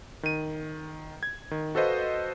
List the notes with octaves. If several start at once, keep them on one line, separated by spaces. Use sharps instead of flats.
D#3 D#7
G#6
D#3
F#4 A4 B4 C5 D#5 F5